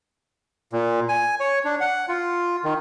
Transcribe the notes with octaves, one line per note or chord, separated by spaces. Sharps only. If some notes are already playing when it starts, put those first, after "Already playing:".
A#2
G#5
C#5
D4
F#5
F4
D#3